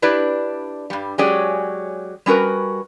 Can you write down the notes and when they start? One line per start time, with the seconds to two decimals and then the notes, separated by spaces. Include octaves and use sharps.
0.02 D4 E4 G4 B4 D5
0.90 G2 G3
1.18 F#3 G#3 C#4 G4 G#4 D5
2.26 G3 C#4 F#4 A#4 B4